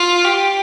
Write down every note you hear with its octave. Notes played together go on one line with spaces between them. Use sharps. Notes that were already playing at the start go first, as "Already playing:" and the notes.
Already playing: F4
G4